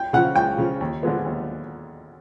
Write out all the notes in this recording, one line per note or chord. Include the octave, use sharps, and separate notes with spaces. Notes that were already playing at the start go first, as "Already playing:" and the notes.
Already playing: G5
C#3 F3 F#5
C#2 G5
C#3 F3
D#2
D3 F3 G#3 B3
D#2